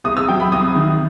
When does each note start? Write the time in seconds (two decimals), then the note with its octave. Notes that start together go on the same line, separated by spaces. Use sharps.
0.04 C2 D#6
0.17 E6
0.28 F#3 G5
0.40 B5
0.52 C2 D#6
0.75 D#3